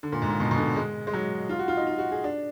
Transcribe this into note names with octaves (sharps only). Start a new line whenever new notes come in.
D3
A#2
G#2
A#2
B2
B2
D3
G#3
G#3
F#3
F4
F#4
F4
D#4
F4
F#4
G#4
D4